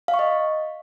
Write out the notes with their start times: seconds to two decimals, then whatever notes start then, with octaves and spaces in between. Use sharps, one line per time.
0.08 F5
0.14 C#6
0.19 D#5